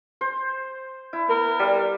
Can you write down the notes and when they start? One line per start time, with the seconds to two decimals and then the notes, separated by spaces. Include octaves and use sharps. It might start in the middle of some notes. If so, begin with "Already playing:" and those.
0.21 C5
1.13 E4
1.28 B3 A#4
1.59 G3 F5